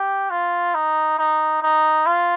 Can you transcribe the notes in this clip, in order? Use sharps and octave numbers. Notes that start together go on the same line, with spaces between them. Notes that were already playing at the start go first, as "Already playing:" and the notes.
Already playing: G4
F4
D#4
D#4
D#4
F4